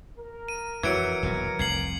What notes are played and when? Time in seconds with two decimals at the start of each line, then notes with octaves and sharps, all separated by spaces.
0.18 A#4
0.48 D#7
0.83 F2 E3 F#3 G#6 C#7 D7
1.23 D#1 B1 B2
1.59 F1 C2 G#6 C7 F#7